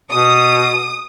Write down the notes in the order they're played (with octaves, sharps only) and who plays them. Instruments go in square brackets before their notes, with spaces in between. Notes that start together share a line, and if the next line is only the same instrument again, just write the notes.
[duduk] B2 [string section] D#6